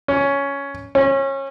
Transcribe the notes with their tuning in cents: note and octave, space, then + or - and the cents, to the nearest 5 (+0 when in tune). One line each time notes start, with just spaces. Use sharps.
C#4 +10
C#4 -25